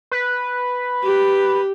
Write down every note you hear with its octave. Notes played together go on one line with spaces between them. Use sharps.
B4
G4